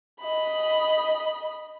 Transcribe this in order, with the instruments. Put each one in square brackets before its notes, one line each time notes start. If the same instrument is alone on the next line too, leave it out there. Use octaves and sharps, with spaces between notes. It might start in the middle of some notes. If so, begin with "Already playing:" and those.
[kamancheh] D#5 B5